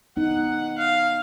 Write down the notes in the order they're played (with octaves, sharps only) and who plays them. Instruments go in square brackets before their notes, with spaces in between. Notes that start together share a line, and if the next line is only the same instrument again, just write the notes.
[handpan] B3 D#4 [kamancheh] F#5
[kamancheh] F5